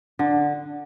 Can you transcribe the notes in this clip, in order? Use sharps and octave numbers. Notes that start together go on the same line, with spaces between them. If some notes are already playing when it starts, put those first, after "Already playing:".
D3